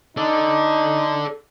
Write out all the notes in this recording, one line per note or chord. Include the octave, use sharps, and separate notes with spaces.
D#4 A4 D5